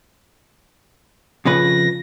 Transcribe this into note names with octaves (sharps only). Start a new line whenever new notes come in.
F2 C#3 B4 A#6